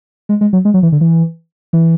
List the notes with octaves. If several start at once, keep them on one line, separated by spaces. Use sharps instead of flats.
G#3
G#3
F#3
G#3
F#3
E3
D3
E3
E3